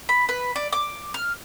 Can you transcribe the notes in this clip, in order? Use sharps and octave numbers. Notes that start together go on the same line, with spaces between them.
B5
B4
D5
D6
F6